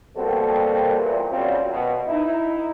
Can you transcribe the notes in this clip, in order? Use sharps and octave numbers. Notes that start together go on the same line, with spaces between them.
B2 G3 A#3 C4 F#4 A4
E2 A#2
F#2 C#3 F#3 G3 C4 F4
B2
D#4 E4